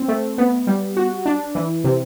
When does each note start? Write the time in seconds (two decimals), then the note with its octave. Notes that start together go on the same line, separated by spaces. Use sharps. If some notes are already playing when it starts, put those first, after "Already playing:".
Already playing: C4
0.08 A3
0.38 B3
0.67 G3
0.97 F#4
1.25 D4
1.55 E3
1.84 C3